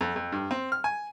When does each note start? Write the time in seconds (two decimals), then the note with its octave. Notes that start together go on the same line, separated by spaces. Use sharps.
0.01 F2
0.16 F2
0.32 G2
0.51 C4
0.72 F6
0.84 G#5